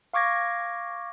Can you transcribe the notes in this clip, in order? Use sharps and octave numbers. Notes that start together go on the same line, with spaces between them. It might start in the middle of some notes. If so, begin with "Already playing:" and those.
F5 C#6 D6 G#6 A#6